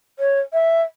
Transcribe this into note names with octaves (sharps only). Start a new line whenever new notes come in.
C#5
E5